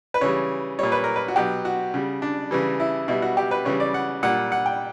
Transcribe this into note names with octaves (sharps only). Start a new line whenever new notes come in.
B4
C#3 E3 G3 C#5
A#2 G3 C#5
B4
A#4
B4
F#4
B2 F#3 G4
F#4
C#3 G3
D4
C#3 E3 G3
E4
B2 G3 E4
F#4
G4
B4
C#3 E3 G3 C#5
D5
F#5
A#2 G3 F#5
F#5
G5